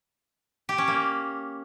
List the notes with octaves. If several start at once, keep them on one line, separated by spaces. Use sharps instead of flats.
G4
C#4
A#3